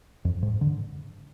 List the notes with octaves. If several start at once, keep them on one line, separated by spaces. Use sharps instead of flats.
F2
G#2
D3